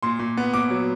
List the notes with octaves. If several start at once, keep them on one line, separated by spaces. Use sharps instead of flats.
A#2 C6
A#2
B3
A#2 D6
F#3